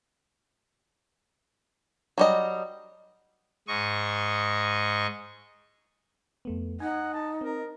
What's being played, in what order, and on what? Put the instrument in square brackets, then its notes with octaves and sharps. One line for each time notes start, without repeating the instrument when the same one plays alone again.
[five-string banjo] F#3 G3 D#5
[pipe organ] G#2 D#5 C#6
[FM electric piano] F2 A3 B3
[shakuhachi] D#4 [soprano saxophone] F#5 [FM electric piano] G#5
[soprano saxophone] A5
[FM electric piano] C4 [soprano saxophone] A#4